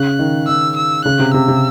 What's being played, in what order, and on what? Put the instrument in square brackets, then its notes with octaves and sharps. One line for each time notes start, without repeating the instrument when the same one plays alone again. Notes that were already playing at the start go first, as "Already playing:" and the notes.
Already playing: [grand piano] C#3 [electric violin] F#6
[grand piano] D#3
[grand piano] D#3 [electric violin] E6
[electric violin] E6
[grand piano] C#3 [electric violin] F#6
[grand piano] C3
[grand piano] C3 [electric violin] E6
[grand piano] C3